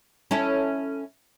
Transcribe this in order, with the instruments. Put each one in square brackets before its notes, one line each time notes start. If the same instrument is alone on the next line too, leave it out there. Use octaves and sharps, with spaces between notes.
[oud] C#4 E4 A4